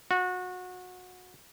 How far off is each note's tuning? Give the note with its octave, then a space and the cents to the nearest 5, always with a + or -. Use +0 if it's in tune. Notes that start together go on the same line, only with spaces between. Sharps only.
F#4 -25